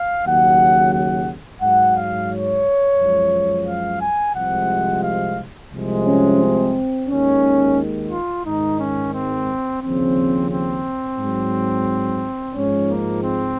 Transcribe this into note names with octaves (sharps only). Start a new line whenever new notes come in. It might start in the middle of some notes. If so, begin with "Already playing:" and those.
Already playing: F5
D#2 C#3 F#3 F#5
F#5
G#2 F#3 F#5
F5
C#5
F#2 F3 G#3
F5
G#5
C2 C3 F3 G#3 F#5
F5
C2 C3 F3 G#3
C#4
C4
D#2 D#3 G#3 C#4
F4
G#2 D#3 G#3 D#4
C#4
C4
D#2 C#3 F3 C4
C4
G#2 F#3
G#2 F3 G#3 C#4
A#3
C4